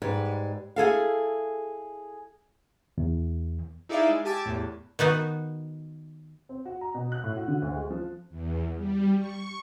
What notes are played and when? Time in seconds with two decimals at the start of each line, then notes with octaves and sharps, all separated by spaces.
0.02 G#2 G3 B4
0.76 E4 G#4 A4 F5
2.98 E2
3.89 D#4 E4 G#4 D5 E5 F5
4.09 G#3
4.25 G4 G#5 A5 D6 E6
4.46 E2 A2
4.99 D#3 B3 D#4 F#4
6.49 C4
6.66 F#4
6.81 A#5
6.95 B2
7.12 F#6
7.24 A2
7.36 F#4
7.48 D3
7.62 D2
7.76 G#3
7.90 F3
8.30 E2
8.76 G3
9.17 C#6